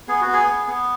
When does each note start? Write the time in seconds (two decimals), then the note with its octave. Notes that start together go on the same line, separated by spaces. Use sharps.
0.08 B3 G#4
0.21 F#4
0.28 B3
0.33 G#4
0.47 B3
0.67 B3